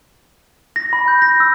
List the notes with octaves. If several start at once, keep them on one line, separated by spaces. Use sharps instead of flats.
A#6
B5
G6
A#6
E6